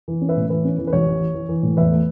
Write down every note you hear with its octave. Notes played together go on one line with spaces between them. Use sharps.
E3
C#4
B4 E5
A2
E3 B4
C#4
E3
B4
A1 C#5
E3
E3
E3
E3
A2
E2 B4 E5
A3